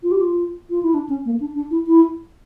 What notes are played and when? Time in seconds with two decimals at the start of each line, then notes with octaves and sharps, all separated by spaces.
0.03 F4
0.11 G4
0.21 F4
0.70 F4
0.83 E4
0.94 D4
1.09 C#4
1.25 A#3
1.40 D4
1.55 D4
1.71 E4
1.87 E4